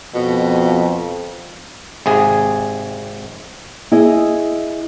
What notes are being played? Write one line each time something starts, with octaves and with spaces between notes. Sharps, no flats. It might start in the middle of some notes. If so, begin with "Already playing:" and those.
F2 B2
G#1 C3 G#4 G#5
E4 G#4 D#5